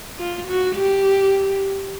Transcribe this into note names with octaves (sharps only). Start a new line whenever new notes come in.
F4
F#4
G4